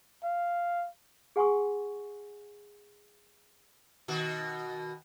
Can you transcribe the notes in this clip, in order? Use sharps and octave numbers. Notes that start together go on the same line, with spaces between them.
F5
G#4 F#5 G#5 C6 C#6 D#6
B2 D#3 F#4